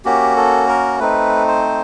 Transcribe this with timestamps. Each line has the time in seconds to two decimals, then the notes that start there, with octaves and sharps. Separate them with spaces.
0.05 A#3 C#4 F#4 G4
0.37 A4
0.68 A#4
0.99 A3 C4 D#4 B4
1.48 C5